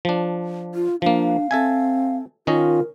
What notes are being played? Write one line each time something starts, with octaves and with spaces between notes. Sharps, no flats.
F3 D4
F4
F3 A#3 D4 F5
C4 A4 E5 G#5
D#3 C#4 F4 A#4 D#5